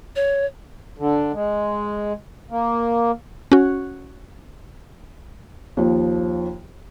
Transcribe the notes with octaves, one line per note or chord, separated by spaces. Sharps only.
C#5
D3
G#3
A#3
C#4 F#4
D#2 F3